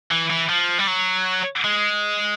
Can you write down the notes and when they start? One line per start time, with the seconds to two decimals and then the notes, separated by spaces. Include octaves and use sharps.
0.11 E3
0.30 E3
0.49 F3
0.79 G3
0.87 F#3
1.64 G#3